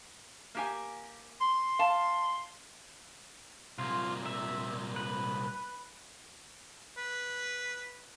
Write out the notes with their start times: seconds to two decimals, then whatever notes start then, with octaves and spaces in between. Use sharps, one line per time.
0.55 A#3 G4 G#5
1.41 C6
1.79 F5 A5
3.78 C2 A#2 F4
4.26 E5
4.96 B4
6.98 B4